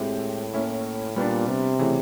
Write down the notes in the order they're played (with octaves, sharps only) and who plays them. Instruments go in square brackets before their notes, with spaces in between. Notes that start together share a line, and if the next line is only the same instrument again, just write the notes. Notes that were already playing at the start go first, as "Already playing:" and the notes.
Already playing: [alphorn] A2 [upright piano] G#3 C4 E4 G4
[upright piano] A#3 C#4 E4
[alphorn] A#2 [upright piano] G3 B3 D4
[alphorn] C3
[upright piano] C#3 E3 A3